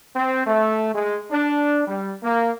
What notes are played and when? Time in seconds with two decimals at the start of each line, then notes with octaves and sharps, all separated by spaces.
0.15 C4
0.45 A3
0.93 G#3
1.31 D4
1.87 G3
2.22 A#3